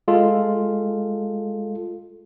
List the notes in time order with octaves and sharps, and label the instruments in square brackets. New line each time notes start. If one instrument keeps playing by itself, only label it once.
[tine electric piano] G#3 F4 A4